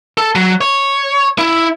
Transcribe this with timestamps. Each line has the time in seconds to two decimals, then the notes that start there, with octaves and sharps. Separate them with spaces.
0.18 A4
0.35 F#3
0.61 C#5
1.39 E4